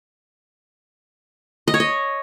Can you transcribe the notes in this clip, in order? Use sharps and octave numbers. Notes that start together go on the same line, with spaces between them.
D#5
C#5
D#5